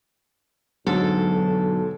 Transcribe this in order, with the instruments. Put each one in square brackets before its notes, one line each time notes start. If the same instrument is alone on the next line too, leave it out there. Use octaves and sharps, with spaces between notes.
[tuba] B1 [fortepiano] G#2 [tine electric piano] D3 F#3 [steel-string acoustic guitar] A4